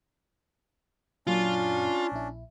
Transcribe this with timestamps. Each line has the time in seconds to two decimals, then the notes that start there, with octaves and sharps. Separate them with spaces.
1.27 F#2 A#2 C#4 D4 F4
2.12 A#1 E4